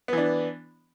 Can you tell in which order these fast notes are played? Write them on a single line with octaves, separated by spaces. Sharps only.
B3 E3 D4